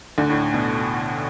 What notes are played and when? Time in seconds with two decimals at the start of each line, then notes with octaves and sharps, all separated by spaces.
0.18 D2 D3
0.30 A2
0.54 B2